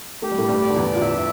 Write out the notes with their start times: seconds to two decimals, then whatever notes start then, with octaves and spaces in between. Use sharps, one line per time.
0.22 A3 G4
0.31 G3
0.38 A2 A3
0.49 G2 G3
0.62 D5
0.70 D3
0.75 E2 E3
0.95 F3
1.01 E2 E3 E5